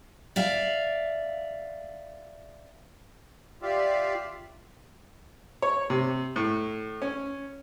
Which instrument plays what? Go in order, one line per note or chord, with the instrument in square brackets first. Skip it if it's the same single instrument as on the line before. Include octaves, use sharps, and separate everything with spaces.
[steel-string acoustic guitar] D5 E5 F5
[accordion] F4 G4 D5 E5 F5
[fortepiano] C#5
C3
A2
C#4